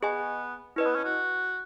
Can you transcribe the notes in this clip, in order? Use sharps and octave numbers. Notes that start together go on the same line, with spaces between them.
B3 G#4 D#5 G#5
C#4 E4 B4 D#5
B3
C#4
F#4